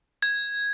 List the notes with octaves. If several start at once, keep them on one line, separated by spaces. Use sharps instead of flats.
G#6